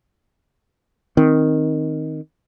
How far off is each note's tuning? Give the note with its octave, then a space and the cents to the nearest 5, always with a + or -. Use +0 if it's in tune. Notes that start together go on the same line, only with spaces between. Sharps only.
D#3 +0 C4 +0